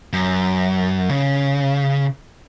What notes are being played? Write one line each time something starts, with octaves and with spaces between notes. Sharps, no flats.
F#2
C#3